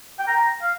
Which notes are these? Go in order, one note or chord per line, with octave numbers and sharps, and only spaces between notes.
G5
A#5
F5